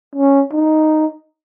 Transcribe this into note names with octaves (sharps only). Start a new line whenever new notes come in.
C#4
D#4